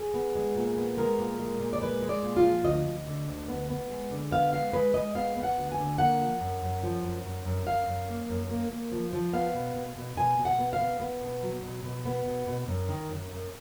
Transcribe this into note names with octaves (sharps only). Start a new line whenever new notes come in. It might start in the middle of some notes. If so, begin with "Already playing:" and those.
Already playing: G#4
B3
G#3
A#2
B3
G#3 A#4
A#2
G#3
A#2
D5
G#3 B4
G#3
D5
A#2
F4
F3
D2 D#5
D2
D3
D2
B3
B3
G#3
D3
B3 F5
G#3 F5
G#3 B4
G#3 D#5
B3 F5
B3
F#5
D2
G#5
D3
A#3 F#5
F3
F#2
F#2
F3
F#2
F#2
F#2
F#2 F5
F#2
A#3
F#2
A#3
A#3
F3
F3
B3 F5
B2
B2
B2
B2 G#5
B2
F#5
B3
F5
B3
B3
B2
F#3
B2
B2
B3
B2
B2
F#2
D#3
F#2
F#2